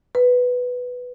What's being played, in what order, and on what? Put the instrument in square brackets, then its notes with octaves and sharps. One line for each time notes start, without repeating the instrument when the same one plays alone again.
[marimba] B4